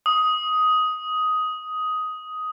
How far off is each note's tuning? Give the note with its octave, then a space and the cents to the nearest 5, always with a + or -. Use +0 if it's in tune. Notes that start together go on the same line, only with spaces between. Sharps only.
D#6 +10